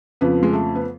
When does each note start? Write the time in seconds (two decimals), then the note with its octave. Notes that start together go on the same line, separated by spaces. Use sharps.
0.21 F2 C#3 F3 B3
0.43 G#3
0.53 A3
0.75 B3